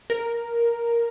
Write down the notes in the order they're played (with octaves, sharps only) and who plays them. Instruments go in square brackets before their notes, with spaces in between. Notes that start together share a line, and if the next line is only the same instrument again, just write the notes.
[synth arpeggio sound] A#4